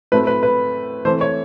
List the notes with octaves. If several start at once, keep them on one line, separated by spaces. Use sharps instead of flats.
A2 F#3 A3 C4 B4
B4
B4
E3 A3 C4 C5
C#5